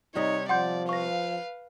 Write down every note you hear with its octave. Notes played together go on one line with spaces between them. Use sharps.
C3 G3 D#4 C#5 D#5
F3 D5 F#5 C6 G6
B4 F5 C#6 A#6